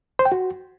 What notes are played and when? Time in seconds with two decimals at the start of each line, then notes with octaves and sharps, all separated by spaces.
0.19 C5
0.25 G5
0.32 F#4